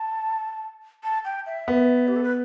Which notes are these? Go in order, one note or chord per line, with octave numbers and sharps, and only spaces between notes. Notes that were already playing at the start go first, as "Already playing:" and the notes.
Already playing: A5
A5
G5
E5
B3
G4
A4
B4